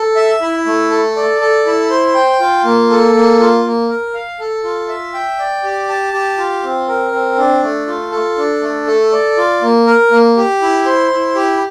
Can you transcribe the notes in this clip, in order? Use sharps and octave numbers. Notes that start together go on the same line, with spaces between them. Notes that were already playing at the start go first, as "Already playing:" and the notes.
Already playing: A4
E5
E4
A3
A4
D5
A4
E4
C5
G5
F4
A#3
A4
A#3
F4
A#3
A#4
F5
A4
F4
E5
G5
D5
G4
A5
G4
F4
C4
A#4
C4
D4
A3
F4
A4
D4
A3
A4
D5
F4
A#3
A#4
A#3
G4
E4
C5
E4
G4